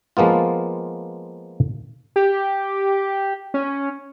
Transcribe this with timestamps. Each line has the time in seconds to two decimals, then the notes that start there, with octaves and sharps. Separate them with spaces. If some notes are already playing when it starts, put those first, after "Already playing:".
0.17 F3 G#3 A#3 B3 F4
2.16 G4
3.54 C#4